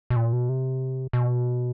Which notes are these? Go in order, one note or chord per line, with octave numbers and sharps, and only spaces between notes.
B2
A#2
B2
C3
B2